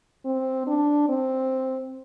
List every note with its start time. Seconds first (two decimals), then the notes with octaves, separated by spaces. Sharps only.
0.25 C4
0.67 D4
1.09 C4